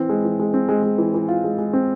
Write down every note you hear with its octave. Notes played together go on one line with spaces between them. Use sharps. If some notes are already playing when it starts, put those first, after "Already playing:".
Already playing: E3 C4
G#3
E3
G#3
C4
G#3
G#3
E3
E3
F4
G#3
G#3
C4